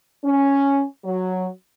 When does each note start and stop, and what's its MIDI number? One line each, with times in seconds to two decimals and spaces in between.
0.25 0.83 61
1.04 1.47 54